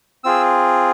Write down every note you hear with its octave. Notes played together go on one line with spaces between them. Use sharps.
C4 F4 G#4 E6